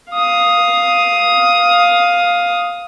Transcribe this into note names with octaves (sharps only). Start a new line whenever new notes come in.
F5 D#6